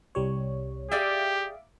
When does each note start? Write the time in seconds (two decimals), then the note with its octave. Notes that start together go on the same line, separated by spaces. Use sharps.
0.15 C2 G3 C#5
0.91 G4 G#4 D5 E5 F5 G5 D6